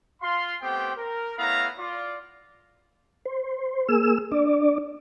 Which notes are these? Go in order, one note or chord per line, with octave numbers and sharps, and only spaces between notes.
F4 F5 C6
A3 B3 C4 G4 C5 G5
A#4
A3 B3 E4 C#5 F5 A#5
F4 D5
C5
A#3 G#4 E6
D4 D5